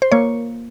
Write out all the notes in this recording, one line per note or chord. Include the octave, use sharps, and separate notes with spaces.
C5
A#3 C#5